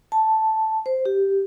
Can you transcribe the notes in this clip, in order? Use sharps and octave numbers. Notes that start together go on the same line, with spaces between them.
A5
C5
G4